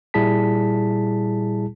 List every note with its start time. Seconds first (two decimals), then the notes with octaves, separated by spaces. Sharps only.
0.14 A#2 G3 E4 G#4 A5 B6